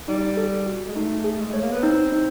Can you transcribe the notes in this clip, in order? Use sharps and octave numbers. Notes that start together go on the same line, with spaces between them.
G3 D#4
A4
F#4
G#3
A3 D#4
G#4
G#3
A3 C#5
A#3
B3
C4 D#4
D#4